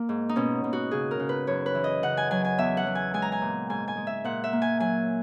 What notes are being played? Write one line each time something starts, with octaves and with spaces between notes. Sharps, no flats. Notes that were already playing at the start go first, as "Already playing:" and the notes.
Already playing: A#3
G#2
D#4
B2 C#4
B2
F#4
C#3 G#4
A#4
C#3
B4
F#2 C#5
B4
E3
D#5
C#3 F#5
G#5
F#3 G#5
G#5
E2 E5
F#5
F#3
G#5
G#3 G#5
A#5
G#5
A#2
G#2 G#5
G#5
G#3
E5
A#2 F#5
E5
A#3
G#5
F#3 G#5